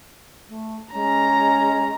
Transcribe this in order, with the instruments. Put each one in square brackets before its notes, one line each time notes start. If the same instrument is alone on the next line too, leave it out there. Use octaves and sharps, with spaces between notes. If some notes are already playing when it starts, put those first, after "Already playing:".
[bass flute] A3
[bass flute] G#3 [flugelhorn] C#4 [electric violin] A#5